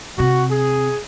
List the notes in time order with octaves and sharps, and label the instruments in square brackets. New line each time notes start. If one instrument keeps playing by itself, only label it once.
[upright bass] C3 C4 [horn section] F#4
[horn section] G#4